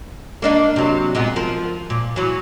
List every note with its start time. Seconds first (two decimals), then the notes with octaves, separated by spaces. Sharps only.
0.42 A#3 D4 D#4
0.76 C3 F#3
1.15 A#2 G#3 B3
1.36 F3 A#4
1.90 A#2
2.16 E3 F#3